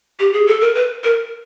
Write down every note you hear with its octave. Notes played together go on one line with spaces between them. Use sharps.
G4
G#4
A4
A#4
B4
A#4